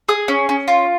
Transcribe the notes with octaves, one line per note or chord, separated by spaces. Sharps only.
G#4 D#6
C#4
C#4
F4